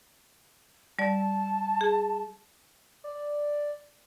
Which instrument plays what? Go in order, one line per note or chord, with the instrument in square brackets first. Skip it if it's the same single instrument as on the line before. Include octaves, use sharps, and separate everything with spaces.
[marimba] G3 D5 [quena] A5
[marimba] G#4
[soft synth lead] D5